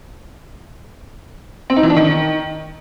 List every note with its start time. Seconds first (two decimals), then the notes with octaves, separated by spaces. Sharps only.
1.70 C4
1.76 D#4
1.83 E3
1.90 D4
1.96 D#3